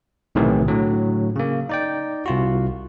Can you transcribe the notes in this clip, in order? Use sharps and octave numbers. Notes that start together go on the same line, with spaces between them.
B1 A2 C3 D#3 E3
A2 D3 F#3
C#3 A#3
D#4 D5 G5
C2 F4 F#4